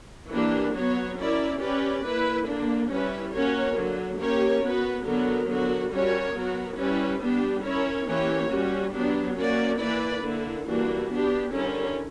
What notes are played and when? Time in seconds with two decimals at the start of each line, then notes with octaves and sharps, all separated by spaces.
0.31 E3 A#3 D4 G4
0.74 F#3 B3 F#4 C#5
1.17 C#4 E4 A#4 D5
1.60 C#4 G4 B4 D5
2.03 A#3 E4 B4
2.47 D3 A#3 D4
2.89 G3 C#4 E4 B4
3.33 A#3 C#4 F#4 A#4 C#5
3.76 D3 F#3 A#3
4.19 A#3 C#4 G4 A#4 C#5
4.62 B3 F#4 B4
5.05 D3 F#3 B3 F#4 A#4
5.48 D3 F#3 B3 F#4 A#4
5.92 G3 C#4 F#4 A#4 C#5
6.35 F#3 B3 F#4 A#4
6.78 G3 C#4 E4 B4
7.21 G3 B3 D4 G4
7.64 C#4 E4 A#4 C#5
8.07 E3 A#3 C#4 G4 C#5
8.50 G3 C#4 F#4
8.93 F#3 B3 D4 G4
9.37 A#3 C#4 F#4 A#4 D5
9.80 E3 A#3 E4 B4 D5
10.23 D3 A#3 E4
10.66 E3 G3 A#3 D4 F#4
11.09 B3 D4 G4
11.52 D3 G3 C#4 E4 A#4